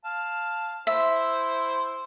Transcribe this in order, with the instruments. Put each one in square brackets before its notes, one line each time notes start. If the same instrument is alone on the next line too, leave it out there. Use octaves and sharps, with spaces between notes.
[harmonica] F5 A5
[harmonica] E4 C5 [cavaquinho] E5